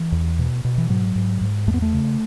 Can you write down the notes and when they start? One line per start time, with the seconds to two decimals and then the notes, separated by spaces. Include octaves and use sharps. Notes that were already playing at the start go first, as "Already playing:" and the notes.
Already playing: E3
0.12 E2
0.39 B2
0.65 B2
0.78 E3
0.89 G#2 F#3
1.16 G#2
1.41 G#2
1.67 E2 A3
1.74 B3
1.82 A3
1.94 C#3